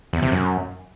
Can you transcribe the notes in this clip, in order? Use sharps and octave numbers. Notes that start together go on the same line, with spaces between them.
E2
C3
F#2